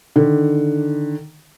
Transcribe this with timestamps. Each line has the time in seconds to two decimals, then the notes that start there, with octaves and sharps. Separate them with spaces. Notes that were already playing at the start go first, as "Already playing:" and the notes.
0.16 D3 D#3